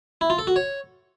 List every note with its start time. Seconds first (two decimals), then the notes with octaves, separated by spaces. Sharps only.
0.21 E4
0.30 F4
0.39 A4
0.47 F#4
0.56 C#5